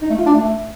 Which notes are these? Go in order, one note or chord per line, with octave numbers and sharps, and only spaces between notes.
D#4
A3
F4
D4
A3